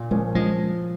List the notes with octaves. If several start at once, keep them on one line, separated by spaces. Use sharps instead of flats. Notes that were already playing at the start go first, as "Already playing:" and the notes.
Already playing: A#2
F3 G#3 A#3 C#4
F3 G#3